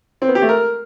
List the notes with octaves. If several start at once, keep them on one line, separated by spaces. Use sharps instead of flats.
C4
B3
G4
A3
A#4